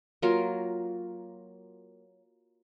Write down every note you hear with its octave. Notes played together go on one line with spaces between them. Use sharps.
F#3 A#3 F4 A#4